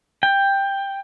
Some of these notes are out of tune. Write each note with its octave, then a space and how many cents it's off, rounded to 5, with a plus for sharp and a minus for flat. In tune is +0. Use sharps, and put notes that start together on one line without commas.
G5 +10